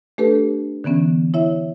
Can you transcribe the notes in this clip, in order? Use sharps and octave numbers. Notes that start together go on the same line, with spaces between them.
A3 D4 G4 A4 B4
D3 E3 B3 C#4
E4 C#5 E5